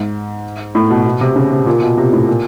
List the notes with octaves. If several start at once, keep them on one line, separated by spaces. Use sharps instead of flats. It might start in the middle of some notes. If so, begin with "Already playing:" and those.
Already playing: G#2
A2
B2
B2
C3
C#3
C3
A#2
B2
C3
A2
A#2